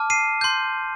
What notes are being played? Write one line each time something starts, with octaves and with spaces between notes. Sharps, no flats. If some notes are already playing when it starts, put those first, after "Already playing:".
Already playing: A5 D6 F6
C7 D#7
C6 G6